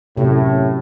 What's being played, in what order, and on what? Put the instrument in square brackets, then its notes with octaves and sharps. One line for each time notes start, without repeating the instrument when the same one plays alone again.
[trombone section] F#2 A2 [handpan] C3